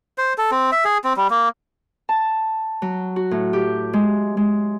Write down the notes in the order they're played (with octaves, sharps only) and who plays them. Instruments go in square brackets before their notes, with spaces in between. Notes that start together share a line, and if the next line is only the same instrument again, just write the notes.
[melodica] C5
A4
C4
E5
G#4
C4
G3
A#3
[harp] A5
F#3
F#4
A2
G4
G#3
G#3